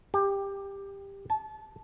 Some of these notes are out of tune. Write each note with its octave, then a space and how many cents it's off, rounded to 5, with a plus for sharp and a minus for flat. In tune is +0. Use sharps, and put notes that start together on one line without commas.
G4 +15
A5 -25